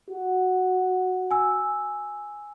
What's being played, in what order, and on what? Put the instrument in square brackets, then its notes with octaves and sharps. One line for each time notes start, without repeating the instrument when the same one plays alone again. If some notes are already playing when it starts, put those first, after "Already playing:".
[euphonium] F#4
[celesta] G#5 E6